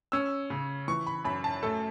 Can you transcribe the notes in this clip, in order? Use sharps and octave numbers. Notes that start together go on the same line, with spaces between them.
C#4 E6
C#3
E3 C#6
B5
F#2 B5
A5
A3 A4